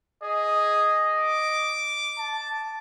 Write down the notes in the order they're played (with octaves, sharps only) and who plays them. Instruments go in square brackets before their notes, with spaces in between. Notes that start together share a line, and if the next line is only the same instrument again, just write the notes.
[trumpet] G#4 [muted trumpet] D#5
[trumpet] D6
[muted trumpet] A5